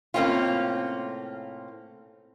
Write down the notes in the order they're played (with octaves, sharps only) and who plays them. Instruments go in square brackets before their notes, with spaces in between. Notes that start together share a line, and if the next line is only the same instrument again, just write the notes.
[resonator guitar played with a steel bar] A2 C3 A#3 C4 C#4 F4